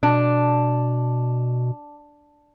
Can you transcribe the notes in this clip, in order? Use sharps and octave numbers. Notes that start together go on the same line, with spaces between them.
B2 D4